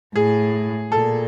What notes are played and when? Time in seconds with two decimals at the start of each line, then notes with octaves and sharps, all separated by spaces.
0.15 A2 G#4
0.92 A#2 A4